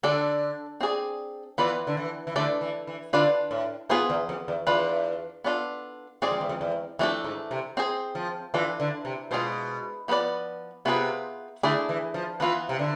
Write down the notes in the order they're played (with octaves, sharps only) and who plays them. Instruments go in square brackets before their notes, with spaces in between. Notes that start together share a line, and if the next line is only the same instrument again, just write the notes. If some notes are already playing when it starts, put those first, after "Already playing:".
[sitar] D3 [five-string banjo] D4 A4 D5
[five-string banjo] C4 G#4 D5
[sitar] E3 [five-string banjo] B3 F4 B4 D5
[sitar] D3
E3
E3
[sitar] D3 [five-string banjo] A3 D4 A4 D5
[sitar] E3
E3
[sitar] D3 [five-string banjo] D4 F4 B4 D5
[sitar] A2
[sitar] G#2 [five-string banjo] B3 F4 G#4 C5
[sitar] E2
F2
E2
[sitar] E2 [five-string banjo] D4 F4 B4
[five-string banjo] B3 D4 F4 A4
[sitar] G#2 [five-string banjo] G#3 C4 G#4 D5
[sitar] F2
E2
F2
E2
[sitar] F2 [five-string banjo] E3 A3 D4 A4
[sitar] G#2
C3
[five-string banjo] C4 G#4 C5
[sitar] F3
[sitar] E3 [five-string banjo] D4 F4 A4
[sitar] D3
C3
[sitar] B2 [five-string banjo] G#3 D4 F4 G#4 C5
[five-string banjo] F3 B3 E4 B4 D5
[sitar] C3 [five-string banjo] B3 F4 G#4 B4
[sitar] D3 [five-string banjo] A3 E4 G#4 D5
[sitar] E3
F3
[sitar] E3 [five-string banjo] B3 F4 B4
[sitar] C3
D3